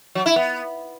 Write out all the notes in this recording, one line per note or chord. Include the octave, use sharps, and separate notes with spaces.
F#3
E4
B3